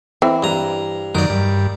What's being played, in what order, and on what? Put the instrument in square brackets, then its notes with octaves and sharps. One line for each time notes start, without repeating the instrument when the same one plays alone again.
[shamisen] E3 C4
[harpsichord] G2 A#5
[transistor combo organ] F#2 D#3 [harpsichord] A#4 D5
[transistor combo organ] G2